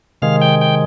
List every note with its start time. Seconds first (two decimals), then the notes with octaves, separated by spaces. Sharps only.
0.22 C3 D#3 G#3 F5
0.41 G5
0.61 G5